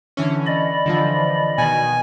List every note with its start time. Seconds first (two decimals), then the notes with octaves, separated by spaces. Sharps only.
0.17 D3 E3 C#4
0.46 D5 D#5 B5
0.86 D3 E3 F3
1.58 B2 D#3 G#5